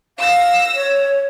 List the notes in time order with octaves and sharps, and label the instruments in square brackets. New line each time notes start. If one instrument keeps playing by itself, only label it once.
[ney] F5 [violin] E6 A#6
[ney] C#5